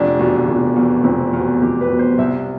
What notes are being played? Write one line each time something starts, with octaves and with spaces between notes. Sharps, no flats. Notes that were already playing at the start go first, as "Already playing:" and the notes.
Already playing: F1 D4
E2 B2
F1
E2 B2
F1 C4
E2 B2
F1 G4
B4
E2 B2
C5
C2 E5